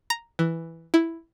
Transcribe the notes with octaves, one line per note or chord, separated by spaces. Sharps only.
A#5
E3
E4